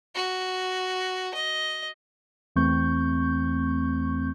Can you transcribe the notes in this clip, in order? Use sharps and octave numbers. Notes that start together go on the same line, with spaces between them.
F#4
D#5
E2 E3 A3 C4 C#6 G6